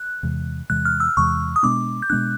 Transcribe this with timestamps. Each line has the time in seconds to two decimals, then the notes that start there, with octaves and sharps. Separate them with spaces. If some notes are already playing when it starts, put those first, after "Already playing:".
Already playing: F#6
0.23 E2 C3 E3 G#3
0.70 E2 C3 E3 G#3 F#6
0.85 F6
1.00 E6
1.17 E2 C3 E3 G#3 C#6
1.56 D#6
1.63 B2 G#3 B3 D4 D6
2.02 G6
2.10 B2 G#3 B3 D4 F#6